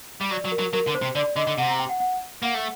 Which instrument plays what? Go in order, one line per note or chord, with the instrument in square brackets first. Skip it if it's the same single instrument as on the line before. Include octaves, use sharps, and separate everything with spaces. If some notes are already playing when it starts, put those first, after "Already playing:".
[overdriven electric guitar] G3
[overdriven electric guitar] F#3 [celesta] D5
[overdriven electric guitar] F#3
[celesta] A#4
[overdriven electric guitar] F#3
[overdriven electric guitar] F#3 [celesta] A#4
[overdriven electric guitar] D3
[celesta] C5
[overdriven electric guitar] C3
[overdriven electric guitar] D3 [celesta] D5
[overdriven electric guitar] D3 [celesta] D#5
[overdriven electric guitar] D3
[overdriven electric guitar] C3 [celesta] F#5
[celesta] A#5
G5
F#5
F#5
[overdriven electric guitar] A#3 [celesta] F#5
[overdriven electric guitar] A3